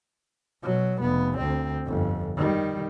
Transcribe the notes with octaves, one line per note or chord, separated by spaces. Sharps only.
B2 F#3
F1 B3
D2 C4
G1 F2
D#3 G3